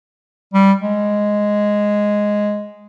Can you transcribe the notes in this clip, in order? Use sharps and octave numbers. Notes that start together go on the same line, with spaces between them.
G3
G#3